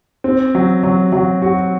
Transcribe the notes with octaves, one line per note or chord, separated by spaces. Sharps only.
C4
F#3
F#3
F#3
F#4